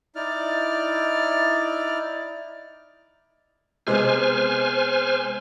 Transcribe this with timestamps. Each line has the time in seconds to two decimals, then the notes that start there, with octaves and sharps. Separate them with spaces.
0.16 D#4 E4 D5 F6
3.87 C3 G#3 B3 C5 G#5 F6